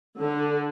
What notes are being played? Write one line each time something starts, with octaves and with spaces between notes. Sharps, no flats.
D3